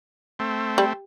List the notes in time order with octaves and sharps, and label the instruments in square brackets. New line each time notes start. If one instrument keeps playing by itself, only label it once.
[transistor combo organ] A3 C4
[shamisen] G3